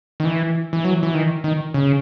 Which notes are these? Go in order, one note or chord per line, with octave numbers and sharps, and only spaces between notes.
D#3
E3
E3
F#3
E3
D#3
D#3
C#3